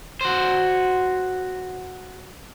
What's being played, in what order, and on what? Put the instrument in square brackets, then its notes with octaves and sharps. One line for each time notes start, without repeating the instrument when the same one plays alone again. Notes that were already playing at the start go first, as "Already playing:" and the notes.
[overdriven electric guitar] F#4 C5